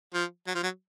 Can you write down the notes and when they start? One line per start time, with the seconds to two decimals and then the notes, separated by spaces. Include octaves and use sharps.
0.14 F3
0.47 F#3
0.55 F3
0.63 F#3